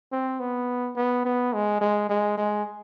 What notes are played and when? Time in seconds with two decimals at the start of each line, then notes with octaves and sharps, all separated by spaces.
0.12 C4
0.40 B3
0.96 B3
1.25 B3
1.54 G#3
1.81 G#3
2.10 G#3
2.37 G#3